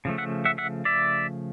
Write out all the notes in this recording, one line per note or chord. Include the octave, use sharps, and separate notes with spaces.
C#3 F3 A3
E5 F#5
E5 F#5
E5 F#5
D5 E5